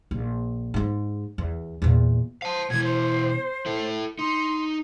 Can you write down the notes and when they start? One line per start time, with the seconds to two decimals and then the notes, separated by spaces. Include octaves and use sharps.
0.11 A#1
0.74 G#2 G#3
1.38 E2
1.82 E2 A#2
2.42 C5 F5 A5
2.70 B2 E3 G#6
2.84 C5
3.66 E4 A4
4.19 D#4 C6